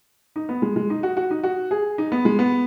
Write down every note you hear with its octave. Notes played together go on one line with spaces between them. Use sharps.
D#4
B3
G#3
G#3
D#4
F#4
F#4
D#4
F#4
G#4
D#4
B3
G#3
B3